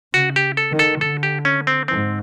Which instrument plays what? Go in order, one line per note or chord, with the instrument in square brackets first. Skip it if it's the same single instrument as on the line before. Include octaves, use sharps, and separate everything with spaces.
[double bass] C#3 [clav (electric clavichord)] F#4
[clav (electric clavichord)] G4
A4
[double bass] D#3
[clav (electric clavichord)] A4
[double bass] D3 [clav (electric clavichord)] A4
[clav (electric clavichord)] G4
C#4
C4
[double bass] G#2 [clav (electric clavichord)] C4